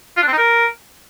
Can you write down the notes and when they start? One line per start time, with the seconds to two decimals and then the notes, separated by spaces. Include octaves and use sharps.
0.17 F4
0.22 D4
0.28 C4
0.33 D#4
0.38 A#4